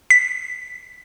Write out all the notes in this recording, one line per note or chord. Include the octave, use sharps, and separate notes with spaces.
B6